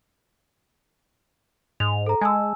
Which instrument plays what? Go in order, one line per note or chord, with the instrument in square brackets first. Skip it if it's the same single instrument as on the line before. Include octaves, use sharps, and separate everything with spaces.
[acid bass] G#2 [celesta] F7
[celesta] A4 A#5
[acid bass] G#3 [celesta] G#5 A5 E6